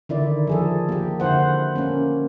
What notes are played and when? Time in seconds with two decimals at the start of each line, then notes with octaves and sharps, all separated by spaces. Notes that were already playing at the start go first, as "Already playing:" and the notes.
0.09 D3 D#3 E4 D5
0.47 F3 G#4 A4
0.89 A#3 G4
1.20 D3 E4 C5 F#5
1.76 A#3 C#4